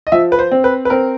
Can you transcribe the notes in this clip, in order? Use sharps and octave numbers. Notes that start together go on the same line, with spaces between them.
D#5
F3 E5
B4
C5
C4
B4
B4
C4 A#4